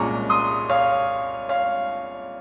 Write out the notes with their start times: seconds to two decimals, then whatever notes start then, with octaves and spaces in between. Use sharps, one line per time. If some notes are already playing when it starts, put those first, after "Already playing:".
Already playing: C2 A#2 G#3 C#4 A#5 C#6
0.29 C6 D#6
0.69 C#5 F5
1.49 C#5 F5